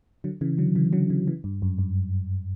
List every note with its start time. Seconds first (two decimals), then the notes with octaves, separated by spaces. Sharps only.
0.24 D3 F#3
0.41 C#3 E3
0.58 D3 F#3
0.75 C#3 E3
0.93 D3 F#3
1.10 C#3 E3
1.27 C#3 E3
1.44 G2
1.62 F#2
1.79 G2